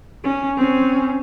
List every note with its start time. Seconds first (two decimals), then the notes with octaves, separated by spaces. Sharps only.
0.24 C#4
0.57 C4 C#4